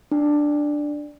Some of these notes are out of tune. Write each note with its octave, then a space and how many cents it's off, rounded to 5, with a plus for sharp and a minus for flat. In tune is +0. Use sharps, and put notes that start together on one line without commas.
D4 +5